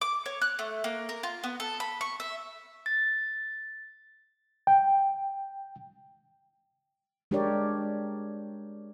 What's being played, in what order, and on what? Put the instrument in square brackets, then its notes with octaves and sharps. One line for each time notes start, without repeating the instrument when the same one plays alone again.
[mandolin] D6
C#5
F#6
A3
A#3
A#4
F4
B3
A4
B5
C#6
E5
[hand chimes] A6
[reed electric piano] G5
[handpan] G#3 D4 G4 A#4 C#5 D5